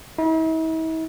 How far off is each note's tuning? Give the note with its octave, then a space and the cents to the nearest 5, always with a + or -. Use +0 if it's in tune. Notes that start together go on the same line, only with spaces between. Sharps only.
E4 -45